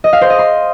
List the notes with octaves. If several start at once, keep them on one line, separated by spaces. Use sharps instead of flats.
D#5
F5
C5
D#5
C6